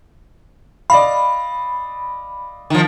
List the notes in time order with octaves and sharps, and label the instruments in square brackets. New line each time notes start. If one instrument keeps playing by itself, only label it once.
[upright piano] D5 D#5 F5 [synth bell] B5
[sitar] D#3 F3